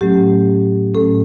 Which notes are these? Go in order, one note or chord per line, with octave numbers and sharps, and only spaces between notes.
A2 F#3 A3 C#4 G4
A2 F#3 A3 C#4 A4